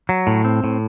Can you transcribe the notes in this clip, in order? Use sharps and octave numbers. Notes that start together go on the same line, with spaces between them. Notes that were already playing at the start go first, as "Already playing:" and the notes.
F#3
A2
C4
A2